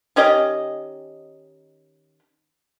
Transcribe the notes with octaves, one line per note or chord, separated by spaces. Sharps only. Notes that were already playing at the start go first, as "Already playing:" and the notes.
D#3 C#4 G4 D#5